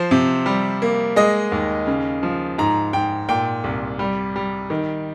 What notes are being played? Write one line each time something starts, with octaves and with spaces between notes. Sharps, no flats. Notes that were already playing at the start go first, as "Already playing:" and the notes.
Already playing: F3 C5
C3
G3
A#3
G#3 D#5
D#2
C#3
F3
G#2 A#5
G#2 G5
A#2 G5
C2
G3
G3
D#3